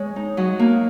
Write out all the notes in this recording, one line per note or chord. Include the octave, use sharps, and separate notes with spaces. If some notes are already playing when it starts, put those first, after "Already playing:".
Already playing: G#3 C#5
D#4
F#3 D#5
A#3